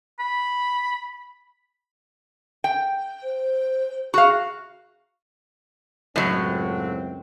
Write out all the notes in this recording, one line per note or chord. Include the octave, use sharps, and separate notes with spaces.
B5
G5
C5
F#4 G#4 F5
C#2 F#2 A2 F#3 C4